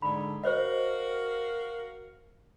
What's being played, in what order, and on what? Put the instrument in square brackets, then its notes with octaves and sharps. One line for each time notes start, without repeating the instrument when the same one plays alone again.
[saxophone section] G#2 D3 [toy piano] B5
[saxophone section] F#4 A#4 F5 [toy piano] C5 C#5 D#5